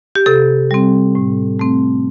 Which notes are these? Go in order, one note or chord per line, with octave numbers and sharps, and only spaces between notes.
G4
C3 A4
G3 C4
A2
A3 C4